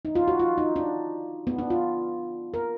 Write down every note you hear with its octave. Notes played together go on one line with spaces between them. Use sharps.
D#4
F4
F#4
F4
D#4
D4
B3
D4
F4
A#4